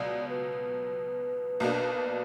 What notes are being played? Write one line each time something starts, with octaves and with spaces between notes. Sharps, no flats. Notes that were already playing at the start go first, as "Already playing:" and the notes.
Already playing: C#2 B2 F#3 D5
B4
B1 B2 A#3 D4